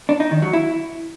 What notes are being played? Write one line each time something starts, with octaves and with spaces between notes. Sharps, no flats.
D4
D#4
D#3
F#3
E4